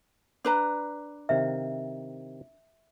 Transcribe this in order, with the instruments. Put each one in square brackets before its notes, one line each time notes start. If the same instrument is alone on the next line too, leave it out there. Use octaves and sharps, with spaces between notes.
[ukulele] D4 B4 A#5
[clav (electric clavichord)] C3 D#3 F5 [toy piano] E5